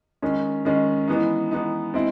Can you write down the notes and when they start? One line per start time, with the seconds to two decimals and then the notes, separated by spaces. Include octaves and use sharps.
0.22 D#3 G#3 C#4
0.65 D#3 G#3 C#4
1.08 E3 G#3 B3 D#4
1.51 E3 G#3 B3 D#4
1.94 G#3 C4 E4